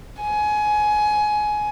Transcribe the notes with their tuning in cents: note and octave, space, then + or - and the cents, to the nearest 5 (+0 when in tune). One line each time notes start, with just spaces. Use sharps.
G#5 +20